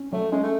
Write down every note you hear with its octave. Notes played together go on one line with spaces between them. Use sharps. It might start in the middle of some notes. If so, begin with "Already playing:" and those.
Already playing: C#4
F#3 A3
G#3 C#4
A3